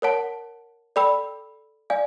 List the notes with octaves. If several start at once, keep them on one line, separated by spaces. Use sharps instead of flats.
A#4 C#5 F#5 A5
A4 D5 G5 B5 E6
D5 F5 G#5